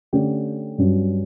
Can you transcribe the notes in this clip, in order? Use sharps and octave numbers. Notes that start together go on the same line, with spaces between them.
D3 A3 C#4 G4
G2 F#3 C#4